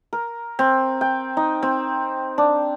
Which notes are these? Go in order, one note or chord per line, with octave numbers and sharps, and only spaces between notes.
A#4
C4
G5
D#4
C4
D4